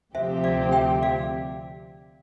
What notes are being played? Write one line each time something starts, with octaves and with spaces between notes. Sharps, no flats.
D2 C3 F3 C4 G4 C5 E5
D5 F5
E5 G5
D5 F5